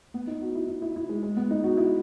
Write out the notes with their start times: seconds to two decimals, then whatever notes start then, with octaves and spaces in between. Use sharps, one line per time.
0.14 B3
0.27 D#4
0.42 F#4
0.55 E4
0.68 E4
0.82 E4
0.96 E4
1.09 G#3
1.23 G#3
1.36 B3
1.51 D#4
1.64 F#4
1.77 E4